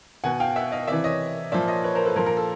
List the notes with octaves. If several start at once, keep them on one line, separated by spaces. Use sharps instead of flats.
B2 F#5 G#5
F5 G5
E5 F#5
D#5 F5
C3 E3 D5 E5
C#5 D#5
A#2 F3 D5 E5
C#5 D#5
B4 C#5
A#4 C5
A4 B4
A#2 F3 A#4
A#4
A4